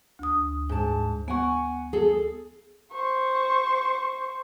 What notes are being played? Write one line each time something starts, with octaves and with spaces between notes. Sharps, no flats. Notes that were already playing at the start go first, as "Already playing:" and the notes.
D2 D#6
G#2 A5
B3 F#5 G#5 C#6
G#4 A4
C5 C#6